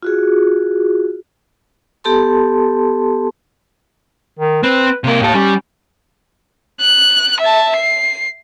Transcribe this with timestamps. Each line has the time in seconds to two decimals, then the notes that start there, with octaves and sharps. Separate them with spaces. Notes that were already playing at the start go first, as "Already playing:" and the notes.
0.03 F4 F#4 G#4
2.04 B3 G4 A4 A5 C6
4.39 D#3
4.63 C4 B4
5.04 C3 A#3 A#4
5.21 D#2 A2 A4
5.34 G3 C#4
6.81 F#6
7.40 E5 A5
7.76 C7